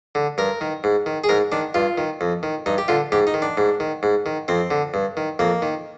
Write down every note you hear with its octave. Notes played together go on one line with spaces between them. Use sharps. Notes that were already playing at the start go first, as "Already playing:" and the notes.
D3
G2 A#4
D#3
G#2
D#3
G#4
G#2 A#4
D#3 D4
G2 F4
D#3
F2
D#3
G2 D#4
G4
D3 F4
G#2 G4
D#4
D#3
D4
G#2
D#3
G#2
D#3
F2 C4
D3
G2
D#3
F2 A#3
D#3